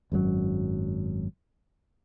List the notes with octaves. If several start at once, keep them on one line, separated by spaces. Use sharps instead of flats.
G#1 F#2 B2 F#3